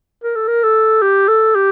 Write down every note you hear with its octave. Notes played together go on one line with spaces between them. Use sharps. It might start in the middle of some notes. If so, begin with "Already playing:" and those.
A#4
A4
A#4
A4
G4
A4
G4